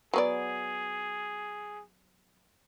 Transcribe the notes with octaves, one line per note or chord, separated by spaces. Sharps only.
F#3 B3 G#4 D5